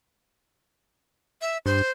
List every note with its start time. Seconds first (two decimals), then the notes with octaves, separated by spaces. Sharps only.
1.41 E5
1.66 G2 C5